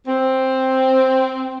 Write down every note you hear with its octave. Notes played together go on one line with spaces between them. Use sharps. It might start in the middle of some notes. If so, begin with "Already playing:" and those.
C4